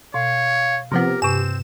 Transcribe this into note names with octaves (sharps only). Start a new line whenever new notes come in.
B2 C#5 F5
C3 F3 B3 G4 A#4
G2 C3 C4 E7